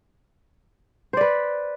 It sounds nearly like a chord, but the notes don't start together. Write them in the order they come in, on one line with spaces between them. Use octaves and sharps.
C5 D5 B4